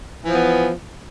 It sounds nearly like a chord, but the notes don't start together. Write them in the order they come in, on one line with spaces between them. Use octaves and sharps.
E3 F3 B3